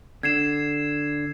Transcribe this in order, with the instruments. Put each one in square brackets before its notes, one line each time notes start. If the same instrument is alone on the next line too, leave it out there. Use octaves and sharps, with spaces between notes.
[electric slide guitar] D3 [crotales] G#6 C7 E7